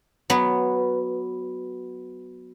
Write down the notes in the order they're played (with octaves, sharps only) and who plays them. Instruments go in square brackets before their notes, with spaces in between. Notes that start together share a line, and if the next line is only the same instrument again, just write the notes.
[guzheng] F#3 B3 B4